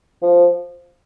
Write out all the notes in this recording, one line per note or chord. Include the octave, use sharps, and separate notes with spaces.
F3